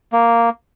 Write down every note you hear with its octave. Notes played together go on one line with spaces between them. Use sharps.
A#3